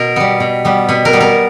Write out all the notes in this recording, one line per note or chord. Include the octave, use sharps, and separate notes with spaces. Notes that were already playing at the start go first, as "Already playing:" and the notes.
Already playing: B2 A#4
G3 B3
B2
G3 B3
B2 B4
A#4
G3 B3
A#4